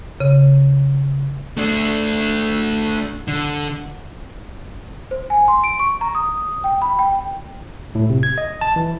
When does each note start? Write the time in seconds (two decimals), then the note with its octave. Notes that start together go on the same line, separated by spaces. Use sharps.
0.20 C#3
1.57 A3 D4
3.28 D3
5.11 C5
5.30 G#5
5.48 C6
5.64 D7
5.79 C#6
6.01 A#5
6.15 D#6
6.64 G5
6.82 B5
6.99 G5
7.95 A2
8.10 C3
8.23 G#6
8.38 D#5
8.61 A5
8.76 E3